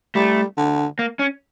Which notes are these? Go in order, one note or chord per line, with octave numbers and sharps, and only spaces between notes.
G3 A3
D3
A#3
C#4